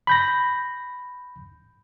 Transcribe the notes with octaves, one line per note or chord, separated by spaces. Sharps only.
B5 G6 A#6